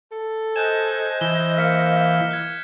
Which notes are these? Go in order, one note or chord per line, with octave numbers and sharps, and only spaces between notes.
A4
C5 D#5 G#5 F#6 G6 E7
E3 E7 G7
A#3 F6 B6 C#7
F#6 G#6